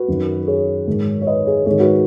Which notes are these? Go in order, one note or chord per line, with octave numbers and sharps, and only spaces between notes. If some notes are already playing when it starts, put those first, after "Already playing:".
Already playing: F#4 B4
F#2 D#3
G#4 C#5
G#2 D#3
C#5
B4 D#5
G#4 C#5
G#2 D#3 G#4 C#5
F#4 B4